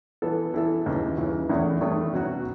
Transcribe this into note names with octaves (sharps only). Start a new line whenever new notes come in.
E3 B3 E4 A4
E3 B3 E4 A4
D#2 C#3 E3
D#2 C#3 E3
E2 D#3 A3 C#4
E2 D#3 A3 C#4
B2 F#3 C#4 F#4